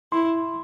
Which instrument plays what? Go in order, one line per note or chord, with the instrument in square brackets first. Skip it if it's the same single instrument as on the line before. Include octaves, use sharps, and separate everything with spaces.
[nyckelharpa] E4 [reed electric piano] C6